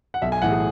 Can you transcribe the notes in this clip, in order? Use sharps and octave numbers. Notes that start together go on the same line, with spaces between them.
F#5
B1 E5
G#5
A2 E3 F#5
G#4